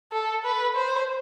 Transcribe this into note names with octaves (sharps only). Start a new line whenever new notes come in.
A4
B4
C5